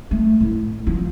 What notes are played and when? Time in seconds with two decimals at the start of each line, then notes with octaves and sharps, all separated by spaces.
0.11 A3
0.41 A2
0.87 F3